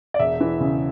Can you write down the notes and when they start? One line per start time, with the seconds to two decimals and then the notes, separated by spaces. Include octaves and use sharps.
0.14 D5
0.19 E1 E5
0.41 E3
0.61 C#3